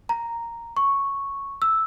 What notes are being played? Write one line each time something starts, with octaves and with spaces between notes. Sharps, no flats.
A#5
C#6
E6